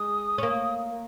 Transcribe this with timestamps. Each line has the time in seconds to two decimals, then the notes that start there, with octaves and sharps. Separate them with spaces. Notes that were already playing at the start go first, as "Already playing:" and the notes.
Already playing: G#3 D#6
0.38 C#4
0.43 A#3